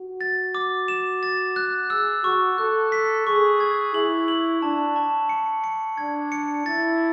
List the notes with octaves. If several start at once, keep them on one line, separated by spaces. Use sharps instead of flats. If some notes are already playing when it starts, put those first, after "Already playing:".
Already playing: F#4
A6
D6
E7
A6
F#6
G#4 E6
F#4 C#6
A4 F#6
B6
G#4 C#6
G#6
E4 F#7
F#7
D4 A5
A5
C#7
C#7
D4 G#6
C#7
E4 A6